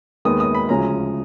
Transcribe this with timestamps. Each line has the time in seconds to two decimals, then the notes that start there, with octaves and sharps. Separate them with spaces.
0.25 D#2 D#3 G#3 B3 D#6
0.40 D#6
0.55 B5
0.69 D2 C#3 F3 G#3 C#4 A#5